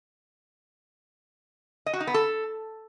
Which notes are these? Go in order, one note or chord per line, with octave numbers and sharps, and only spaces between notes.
D#5
F#4
D#4
B3
A4